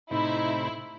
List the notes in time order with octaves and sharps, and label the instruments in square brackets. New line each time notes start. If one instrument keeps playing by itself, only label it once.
[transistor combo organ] A2 C3 [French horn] D#4 [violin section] E4